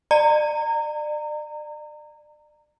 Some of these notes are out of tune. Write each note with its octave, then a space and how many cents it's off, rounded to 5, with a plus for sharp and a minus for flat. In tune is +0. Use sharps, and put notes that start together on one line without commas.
D5 +35 A#5 -25